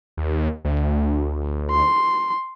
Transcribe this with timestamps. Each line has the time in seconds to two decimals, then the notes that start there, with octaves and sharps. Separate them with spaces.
0.17 D#2
0.64 D2
1.71 C6